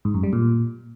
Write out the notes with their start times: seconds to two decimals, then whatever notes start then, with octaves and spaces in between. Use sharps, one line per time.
0.05 G#2
0.14 F#2
0.23 G3
0.33 A#2